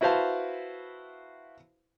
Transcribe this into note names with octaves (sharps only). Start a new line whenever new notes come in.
E4 F#4 B4 C5 F5 A5